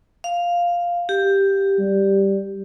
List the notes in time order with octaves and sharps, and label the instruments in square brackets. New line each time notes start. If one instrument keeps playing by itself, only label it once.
[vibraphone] F5
G4
[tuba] G3